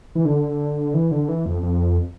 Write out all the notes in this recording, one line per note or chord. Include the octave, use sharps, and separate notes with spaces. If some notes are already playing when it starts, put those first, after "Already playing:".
E3
D3
E3
D3
E3
F2
F2